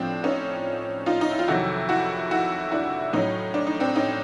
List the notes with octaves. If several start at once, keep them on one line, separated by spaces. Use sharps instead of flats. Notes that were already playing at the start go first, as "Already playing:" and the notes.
Already playing: A2 F3 C4 D4
C#4 D#4
D#4 F4
D#4
E4
F4
F2 C3 D#3 F#3 E4 F#4
E4 F#4
E4 F#4
D4 E4
A2 F#3 C#4 D#4
D4
D#4
C4 D4
C#4 D#4